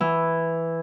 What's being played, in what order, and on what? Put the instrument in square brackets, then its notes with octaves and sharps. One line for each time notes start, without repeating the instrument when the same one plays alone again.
[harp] E3